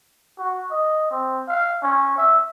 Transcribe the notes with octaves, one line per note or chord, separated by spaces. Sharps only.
F#4
D#5
C4
F5
C#4
E5